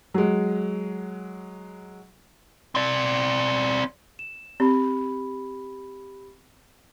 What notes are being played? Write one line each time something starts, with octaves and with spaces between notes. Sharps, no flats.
F#3 G#3
C4 D5
E7
C4 G4 B5